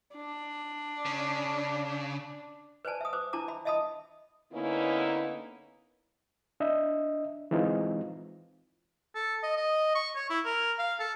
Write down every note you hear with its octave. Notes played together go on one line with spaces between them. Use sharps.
D4
C#3
B4 C5 D5 G#5 A5
E5 D#6
B4 C5 D6
D4 E4 A5 A#5 D6
E5 B5
D#5 E5 A5 B5 D#6
D3 A#3 B3 C#4 D#4 E4
D4 D#5 E5
E3 G#3 C4 D#4 F4
A4
D#5
D#5
C#6
C#5
E4
A#4
F5
A4